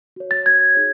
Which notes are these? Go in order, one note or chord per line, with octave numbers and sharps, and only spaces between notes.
F#4 C#5
A6
F#4 C#5 G#6
D#4 G#4 C#5